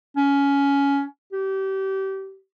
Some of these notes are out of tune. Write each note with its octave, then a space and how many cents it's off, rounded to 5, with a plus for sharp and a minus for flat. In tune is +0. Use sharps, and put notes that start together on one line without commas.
C#4 +15
G4 -30